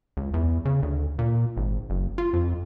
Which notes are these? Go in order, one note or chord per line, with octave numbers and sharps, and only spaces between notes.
C#2
E2
C#3
D2
A#2
G#1
F#1
F4
F2